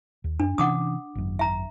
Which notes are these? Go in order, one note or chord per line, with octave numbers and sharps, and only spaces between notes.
D#2
F#2 D4
C3 E3 C#4 F#5 D6 D#6
G#1 F#2
E5 A#5